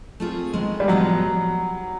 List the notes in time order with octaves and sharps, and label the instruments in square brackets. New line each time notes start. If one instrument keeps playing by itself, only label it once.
[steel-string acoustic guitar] A3 C4 F4 G#4
D#3 G#3 B3 D#4
[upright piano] G3
[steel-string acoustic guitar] A2 F3 G#3 B3 [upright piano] F#3